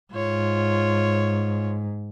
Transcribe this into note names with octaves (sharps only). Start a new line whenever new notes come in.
G#2 F4 C#5